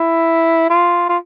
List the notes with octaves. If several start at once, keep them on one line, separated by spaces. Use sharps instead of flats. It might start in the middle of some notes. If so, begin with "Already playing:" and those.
Already playing: E4
F4
F4